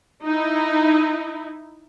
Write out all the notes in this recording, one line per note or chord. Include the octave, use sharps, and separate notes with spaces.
D#4 E4